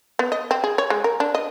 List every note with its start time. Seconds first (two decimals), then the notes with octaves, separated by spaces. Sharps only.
0.19 B3
0.32 D#5
0.51 C4
0.64 G#4
0.78 C#5
0.90 G#3
1.04 A#4
1.20 D4
1.35 D#5